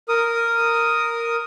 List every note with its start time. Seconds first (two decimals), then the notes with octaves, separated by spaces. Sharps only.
0.09 A#4 D#6